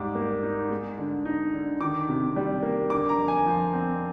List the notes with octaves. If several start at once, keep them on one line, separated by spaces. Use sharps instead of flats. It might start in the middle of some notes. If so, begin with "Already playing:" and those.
Already playing: G#2 G3 D6
A#3
D#4
G#3
D3
D#4
D3
D#3 D6
C3
G3
A#3
D3 D6
A#5
F2
G#5
F3
C4